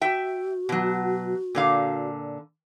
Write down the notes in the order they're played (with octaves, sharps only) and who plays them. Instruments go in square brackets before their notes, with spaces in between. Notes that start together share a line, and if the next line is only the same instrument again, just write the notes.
[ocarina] F#4 [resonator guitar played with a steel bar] E5 G5
[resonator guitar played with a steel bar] B2 F#3
A#2 D3 F5